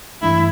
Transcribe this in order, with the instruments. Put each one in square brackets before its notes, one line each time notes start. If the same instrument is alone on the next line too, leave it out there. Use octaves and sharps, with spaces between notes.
[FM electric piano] G2 E3 A3 D4 [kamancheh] E4